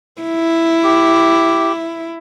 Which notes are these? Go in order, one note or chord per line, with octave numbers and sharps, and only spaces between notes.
E4
G4